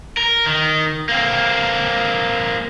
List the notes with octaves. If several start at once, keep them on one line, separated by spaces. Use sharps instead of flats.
A#4
D#3
A#3 C4